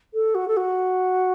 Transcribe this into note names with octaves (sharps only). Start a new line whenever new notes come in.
A4
F#4
A4
F#4